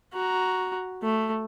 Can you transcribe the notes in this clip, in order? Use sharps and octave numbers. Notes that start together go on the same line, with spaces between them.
F#4 A#5
A3